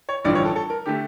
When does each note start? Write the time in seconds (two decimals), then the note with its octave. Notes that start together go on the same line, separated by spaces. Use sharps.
0.09 C#5
0.25 A1 G2 D3 F3 D5
0.35 C#5
0.45 A4
0.56 A4
0.70 A#4
0.86 D3 A3 G4